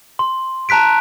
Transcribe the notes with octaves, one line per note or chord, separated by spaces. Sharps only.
C6
A5 A#5 F#6 B6 D7